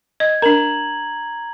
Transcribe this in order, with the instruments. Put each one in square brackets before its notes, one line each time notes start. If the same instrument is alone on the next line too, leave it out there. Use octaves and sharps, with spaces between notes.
[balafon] D#5 [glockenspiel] G#6
[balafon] D4 A#4 [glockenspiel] A#5 F#7